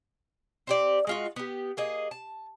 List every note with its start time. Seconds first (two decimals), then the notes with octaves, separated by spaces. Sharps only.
0.67 C4 G4 D5
1.07 G#3 F4 F#4
1.36 B3 G4
1.77 A#3 G#4 D#5
2.11 A5